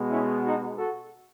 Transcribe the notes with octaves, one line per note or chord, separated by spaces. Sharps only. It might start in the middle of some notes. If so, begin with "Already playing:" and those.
Already playing: B2 G#3 B3
C#4 E4
D#4 F#4
F#4 A4